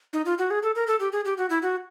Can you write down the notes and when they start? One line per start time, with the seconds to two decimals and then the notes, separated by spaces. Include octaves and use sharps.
0.13 D#4
0.26 F4
0.38 F#4
0.51 G#4
0.63 A4
0.76 A#4
0.87 A4
1.00 G4
1.12 G#4
1.25 G4
1.38 F#4
1.50 E4
1.63 F#4